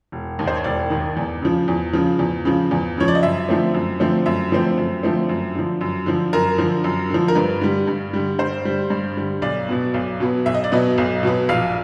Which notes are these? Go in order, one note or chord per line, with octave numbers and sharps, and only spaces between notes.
E1
D#2 D#3
C5
C#5
E1 D5
D#2 D#3
E2
C#3 F3
E2
C#3 F3
E2
C#3 F3
E2
C#3 F3 C#5
D5
D#5
F#2 E5
D3 F3 A3 C4
F#2
D3 F3 A3 C4
F#2 E5
D3 F3 A3 C4
F#2
D3 F3 A3 C4
F#2
D3 F3
F#2
D3 F3
F#2 A#4
D3 F3
F#2
D3 F3
A#4
G2 B4
D3 G3
G2
D3 G3
G2 C5
D3 G3
G2
D3 G3
B1 D5
B2 F#3 B3
B1
B2 F#3 B3
B1 E5
D#5
D5
B2 F#3 B3 D#5
B1
B2 F#3 B3
A#1 F5